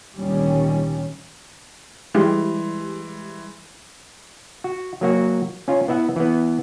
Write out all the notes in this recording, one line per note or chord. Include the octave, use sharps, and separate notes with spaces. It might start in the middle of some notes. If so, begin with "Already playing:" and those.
D2 A#2 D#3 G3 C#4
E3 G3 G#3 C6
F#4
F#3 A#3 F#4
C#4 F4
B3 E4 E5 F#5
E3 B3